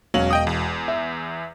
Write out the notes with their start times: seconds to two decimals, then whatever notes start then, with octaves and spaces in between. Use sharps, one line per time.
0.14 E1 F#3 C#4 F5 F#7
0.31 D#5 G5 D#6
0.47 E2
0.88 E5